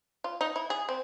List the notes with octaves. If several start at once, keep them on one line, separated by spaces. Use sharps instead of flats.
F4
D#4
E4
G#4
C4